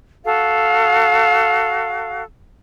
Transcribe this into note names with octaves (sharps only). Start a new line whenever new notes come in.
F#4 A4 F5